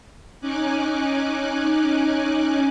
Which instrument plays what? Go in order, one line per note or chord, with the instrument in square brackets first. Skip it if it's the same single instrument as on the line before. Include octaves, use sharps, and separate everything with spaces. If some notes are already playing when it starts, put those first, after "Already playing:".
[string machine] C#4 D#4 G#5 D6 F#6